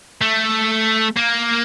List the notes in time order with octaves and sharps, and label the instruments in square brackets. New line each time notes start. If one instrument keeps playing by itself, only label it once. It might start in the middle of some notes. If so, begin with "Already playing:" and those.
[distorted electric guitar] A3
A#3